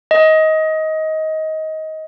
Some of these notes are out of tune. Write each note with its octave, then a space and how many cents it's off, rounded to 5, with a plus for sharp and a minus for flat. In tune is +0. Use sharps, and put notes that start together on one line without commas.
D#5 +20